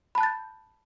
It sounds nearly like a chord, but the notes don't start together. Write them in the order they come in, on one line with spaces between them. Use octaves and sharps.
B5 A5 F#6 A6 G6